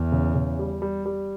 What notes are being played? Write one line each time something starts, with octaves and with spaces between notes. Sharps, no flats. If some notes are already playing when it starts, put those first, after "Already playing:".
Already playing: E2
C#3
C#3
G3
G3
G3